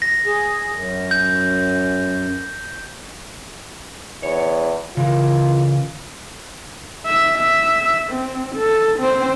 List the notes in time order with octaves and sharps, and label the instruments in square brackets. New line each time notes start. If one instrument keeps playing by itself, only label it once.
[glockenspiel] A#6
[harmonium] G#4
F#2
[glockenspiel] G6
[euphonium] E2 [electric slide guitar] C#5
[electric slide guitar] C#3 E3 A#4 [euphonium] F4
[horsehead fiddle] E5
E5
C4
A4
C4 C5